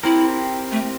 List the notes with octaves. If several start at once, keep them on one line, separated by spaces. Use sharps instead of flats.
C4 E4 G4 A#4
A3